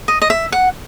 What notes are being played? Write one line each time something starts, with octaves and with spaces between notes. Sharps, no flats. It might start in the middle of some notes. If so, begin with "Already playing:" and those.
D#5
D#5
E5
F#5